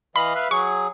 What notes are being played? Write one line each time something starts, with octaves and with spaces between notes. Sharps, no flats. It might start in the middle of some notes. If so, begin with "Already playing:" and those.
E3 D#5 F5 B5
B4 E5 F5
F#3 G#4 C#6